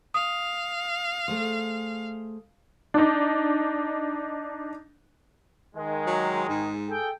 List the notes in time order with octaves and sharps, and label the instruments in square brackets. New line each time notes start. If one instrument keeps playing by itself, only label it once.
[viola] F5 [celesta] D#6
[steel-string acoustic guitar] A3 G#4 C5
[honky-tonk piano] D4 D#4
[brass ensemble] D#3 G#3
[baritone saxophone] F#3
G#2
[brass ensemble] G#4 A4 G5